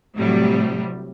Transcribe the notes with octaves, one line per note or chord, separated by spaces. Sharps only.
A2 C3 F#3 G3